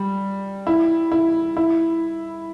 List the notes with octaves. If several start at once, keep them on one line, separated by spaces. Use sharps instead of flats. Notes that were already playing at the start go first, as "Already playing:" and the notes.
Already playing: G3
E4
E4
E4